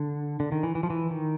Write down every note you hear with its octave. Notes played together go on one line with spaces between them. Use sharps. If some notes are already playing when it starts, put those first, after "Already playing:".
Already playing: D3
D3
D#3
E3
E3
F3
E3
D#3